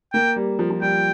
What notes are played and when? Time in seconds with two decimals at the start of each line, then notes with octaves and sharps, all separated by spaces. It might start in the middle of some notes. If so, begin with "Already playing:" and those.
0.13 A#3 G5
0.36 G3
0.59 F3
0.70 F3
0.82 G3 G5